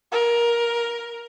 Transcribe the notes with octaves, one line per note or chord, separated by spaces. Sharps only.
A#4